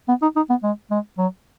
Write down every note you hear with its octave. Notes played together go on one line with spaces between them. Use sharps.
B3
D#4
D#4
B3
G#3
G#3
F#3